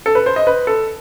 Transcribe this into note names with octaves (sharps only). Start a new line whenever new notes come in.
A4
B4
C5
D#5
B4
A4